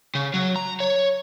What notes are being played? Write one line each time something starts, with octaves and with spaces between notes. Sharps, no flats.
C#3
F#3
A#5
C#5